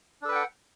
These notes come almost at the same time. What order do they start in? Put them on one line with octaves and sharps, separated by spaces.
D4 A4 B4 G5 F#5